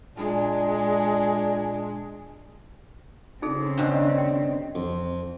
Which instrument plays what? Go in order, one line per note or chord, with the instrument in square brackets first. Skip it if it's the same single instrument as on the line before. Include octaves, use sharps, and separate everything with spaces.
[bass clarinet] A#2 [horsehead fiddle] G#3 D4
[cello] C#3 C4 [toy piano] D#4 G#4 A4
[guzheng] G2 B2 D#3 [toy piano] D4 C5
[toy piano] G5
[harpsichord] F2